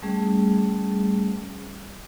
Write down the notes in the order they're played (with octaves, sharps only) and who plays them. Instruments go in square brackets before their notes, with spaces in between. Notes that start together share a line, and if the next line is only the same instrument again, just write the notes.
[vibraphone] G3 A3 C#4 G#4